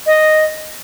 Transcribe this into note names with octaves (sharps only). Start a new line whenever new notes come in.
D#5